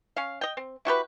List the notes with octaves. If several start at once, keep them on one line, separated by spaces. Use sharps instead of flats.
C#4 F5
D#5 G5
C4
E4 F#4 G4 B4